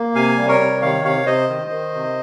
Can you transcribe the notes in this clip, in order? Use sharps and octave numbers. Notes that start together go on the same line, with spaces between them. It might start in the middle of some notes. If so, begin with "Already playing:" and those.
Already playing: A#3
C3 F5 G#5
G3
A#4 C#5
C3
D#3 C#5 F5
C3 C#5 F5
C3 C5 D#5
D#3
D#3
C3